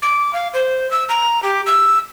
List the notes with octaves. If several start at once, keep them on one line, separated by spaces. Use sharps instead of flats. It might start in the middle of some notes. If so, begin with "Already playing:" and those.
D6
F5
C5
E6
A#5
G4
E6